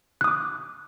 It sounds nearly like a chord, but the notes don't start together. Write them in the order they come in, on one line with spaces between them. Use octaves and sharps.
F#6 D#6 D6